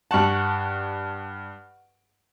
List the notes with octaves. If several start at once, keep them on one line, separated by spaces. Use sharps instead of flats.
G2 F#5 A5 C#6